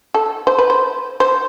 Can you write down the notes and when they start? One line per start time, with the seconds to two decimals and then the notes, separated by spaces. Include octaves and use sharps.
0.14 A4
0.47 C5
0.58 B4
0.70 C5
1.20 C5